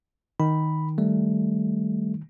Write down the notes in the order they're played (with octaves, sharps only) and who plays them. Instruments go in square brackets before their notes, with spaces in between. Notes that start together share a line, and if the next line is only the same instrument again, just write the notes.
[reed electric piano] D#3 [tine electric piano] B5
[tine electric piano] G3 A3